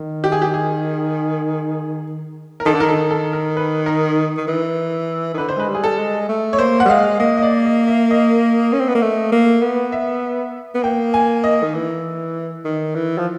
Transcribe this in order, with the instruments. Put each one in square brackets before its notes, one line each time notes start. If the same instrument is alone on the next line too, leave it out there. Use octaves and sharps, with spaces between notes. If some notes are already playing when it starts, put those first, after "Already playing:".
Already playing: [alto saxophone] D#3
[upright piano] G4
G#4
G4
G#4
A#4
[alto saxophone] D#3 [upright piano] A4
[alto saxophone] D3
[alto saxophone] D#3 [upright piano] A#4
[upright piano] A4
A4
A#4
B4
A#4
[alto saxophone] D#3
E3
D#3
[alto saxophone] D3 [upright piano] B4
[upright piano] C5
[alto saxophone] G#3 [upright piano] B4
[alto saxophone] G3
[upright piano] G#4
A4
[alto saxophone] G#3
A3
[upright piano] C#5
[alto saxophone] A#3 [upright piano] C5
[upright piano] F#5
[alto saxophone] G3
[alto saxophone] G#3 [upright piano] F5
[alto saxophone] A#3 [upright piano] D#5
[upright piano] D#5
D5
D#5
E5
D#5
[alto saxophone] C#4
C4
B3
A#3
A3
A#3
B3
[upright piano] E5
[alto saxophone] B3
[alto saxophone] A#3 [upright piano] G5
[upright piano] G#5
D#5
[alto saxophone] D#3
E3
D#3
E3
F3